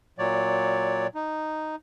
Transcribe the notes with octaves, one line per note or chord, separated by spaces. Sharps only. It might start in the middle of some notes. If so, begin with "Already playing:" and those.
A#2 F#3 C#5 D5
D#4